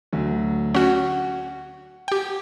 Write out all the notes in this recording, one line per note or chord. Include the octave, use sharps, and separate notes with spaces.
D2 F#3
C#4 F#4 F#5
G4 G5